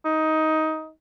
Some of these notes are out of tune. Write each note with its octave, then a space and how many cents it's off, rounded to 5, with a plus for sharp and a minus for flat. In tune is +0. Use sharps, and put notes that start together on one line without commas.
D#4 +15